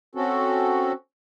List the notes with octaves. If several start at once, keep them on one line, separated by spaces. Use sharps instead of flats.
C4 C#4 F#4 A4